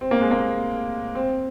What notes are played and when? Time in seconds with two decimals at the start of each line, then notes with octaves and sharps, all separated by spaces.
0.01 C4
0.11 A#3
0.21 G#3
0.31 A#3
1.15 C4